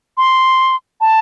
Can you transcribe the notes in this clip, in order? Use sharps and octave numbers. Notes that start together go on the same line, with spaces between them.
C6
A5